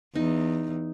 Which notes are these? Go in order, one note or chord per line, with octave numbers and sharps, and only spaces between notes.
E2 D#4